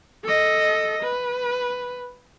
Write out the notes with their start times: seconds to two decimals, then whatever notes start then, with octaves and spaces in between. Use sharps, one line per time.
0.24 A4 D#5
1.03 B4